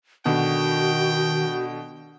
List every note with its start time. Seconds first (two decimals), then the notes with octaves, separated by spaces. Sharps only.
0.26 B2 D3 D#3 F#4 G5